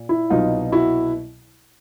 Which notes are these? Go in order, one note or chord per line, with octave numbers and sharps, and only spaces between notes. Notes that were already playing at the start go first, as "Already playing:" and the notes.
Already playing: A#2
E4
C2 B2 F#3 D#4 F4
E4 F#4